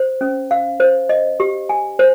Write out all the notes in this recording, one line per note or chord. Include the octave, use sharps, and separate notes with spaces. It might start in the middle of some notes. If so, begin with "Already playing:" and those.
Already playing: C5
C#4
F5
C5
D#5
G4
G#5
C5